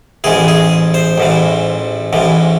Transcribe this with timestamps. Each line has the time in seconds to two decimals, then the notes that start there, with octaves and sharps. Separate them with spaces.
0.24 A1 G#2 E3 G#4
0.48 G#4
0.94 C5
1.18 A1 G#2 E3
2.13 A1 G#2 E3